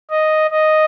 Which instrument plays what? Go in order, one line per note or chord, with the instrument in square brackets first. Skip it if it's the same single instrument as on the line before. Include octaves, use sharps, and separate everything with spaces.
[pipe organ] D#5
D#5